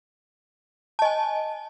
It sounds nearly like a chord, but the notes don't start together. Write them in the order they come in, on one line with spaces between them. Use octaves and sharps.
A5 D#5 G#5